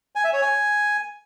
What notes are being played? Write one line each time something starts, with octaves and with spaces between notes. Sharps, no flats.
G#5
E5
C#5
G#5